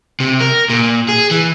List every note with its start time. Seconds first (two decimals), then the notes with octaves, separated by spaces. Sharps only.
0.20 C3
0.40 A#4
0.70 A#2
1.08 G#4
1.31 E3